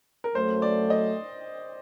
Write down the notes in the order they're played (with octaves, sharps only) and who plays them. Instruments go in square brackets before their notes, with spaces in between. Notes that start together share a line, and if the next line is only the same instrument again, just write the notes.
[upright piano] A#4
[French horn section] F#2 F#3 A3 [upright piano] C5
[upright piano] D5
D#5